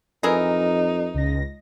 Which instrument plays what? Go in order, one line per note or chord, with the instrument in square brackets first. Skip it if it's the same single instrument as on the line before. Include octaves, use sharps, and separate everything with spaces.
[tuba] F2 [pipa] E3 G#4 A#4 [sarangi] D#4
[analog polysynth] C#2 A#6